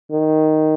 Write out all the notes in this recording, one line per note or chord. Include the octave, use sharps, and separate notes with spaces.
D#3